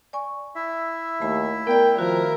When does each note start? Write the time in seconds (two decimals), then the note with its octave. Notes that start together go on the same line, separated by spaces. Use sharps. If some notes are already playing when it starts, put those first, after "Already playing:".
0.13 D5 G#5 C#6
0.55 E4 E5
1.22 D#2 A3 B5
1.67 B3 A#4 D5 G5
1.99 D#3 F3 F#4 A#4